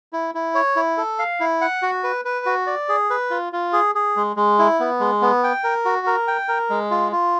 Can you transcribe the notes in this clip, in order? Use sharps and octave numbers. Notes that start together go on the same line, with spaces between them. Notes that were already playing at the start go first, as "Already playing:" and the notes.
E4
E4
C#5
E4
A4
F5
E4
F#5
F#4
B4
B4
F#4
D5
G#4
B4
F4
F4
G#4
G#4
G#3
G#3
E4
B3
G#3
B3
G5
A#4
F#4
A#4
G5
A#4
G#3
F4
F4